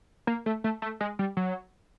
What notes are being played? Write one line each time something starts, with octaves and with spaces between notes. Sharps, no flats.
A#3
A3
A3
A3
G#3
G3
F#3